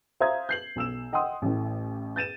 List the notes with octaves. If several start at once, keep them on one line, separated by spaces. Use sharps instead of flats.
C5 E5 F5 A#5 D#6 G#6
G6 C7 F#7
B1 E6 E7
D#5 F#5 G5 C6 D#6
A1 A2
G6 A6 D#7 E7